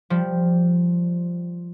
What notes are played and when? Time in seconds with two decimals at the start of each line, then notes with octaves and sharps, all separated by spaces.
0.10 F3 G3